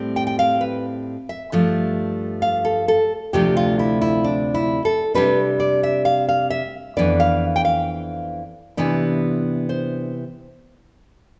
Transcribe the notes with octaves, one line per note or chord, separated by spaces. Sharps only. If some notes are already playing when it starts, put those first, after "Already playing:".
Already playing: A2 G3 C4
G5
G5
F5
B4
E5
G2 F3 A3
F5
A4
A4
D2 C3 F3 A3 D4 G4
F4
E4
E4
D4
E4
A4
C3 G3 D4 B4
D5
E5
F5
F5
E5
F2 E3 B3 D4 D5
F5
G5
F5
C3 E3 B3 D4
C5